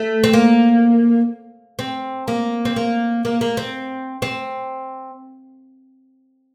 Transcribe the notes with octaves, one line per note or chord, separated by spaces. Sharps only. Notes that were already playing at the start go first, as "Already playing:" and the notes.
Already playing: A3
C4
A#3
C4
A#3
C4
A#3
A#3
A#3
C4
C4